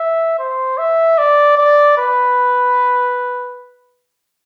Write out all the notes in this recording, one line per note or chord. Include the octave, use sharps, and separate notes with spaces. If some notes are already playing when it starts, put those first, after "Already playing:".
Already playing: E5
C5
E5
D5
D5
B4